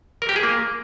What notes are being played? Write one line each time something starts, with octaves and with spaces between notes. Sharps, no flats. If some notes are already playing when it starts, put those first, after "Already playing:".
A#4
G4
G#4
A#3